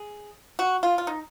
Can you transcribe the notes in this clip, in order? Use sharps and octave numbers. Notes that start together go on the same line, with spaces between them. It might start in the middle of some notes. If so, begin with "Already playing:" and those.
Already playing: G#4
F#4
F4
F4
D#4